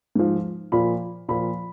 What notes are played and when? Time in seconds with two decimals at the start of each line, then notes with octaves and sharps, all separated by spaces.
0.15 G#2 F3
0.72 A#2 F3 B5
1.28 A#2 F3 B5